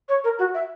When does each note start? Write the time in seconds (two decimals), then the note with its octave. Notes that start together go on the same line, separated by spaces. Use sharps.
0.09 C#5
0.24 A#4
0.39 F#4
0.54 E5